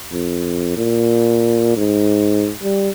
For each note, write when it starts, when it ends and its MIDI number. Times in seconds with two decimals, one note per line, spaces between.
0.13 0.73 41
0.77 1.72 46
1.77 2.52 44
2.63 2.90 55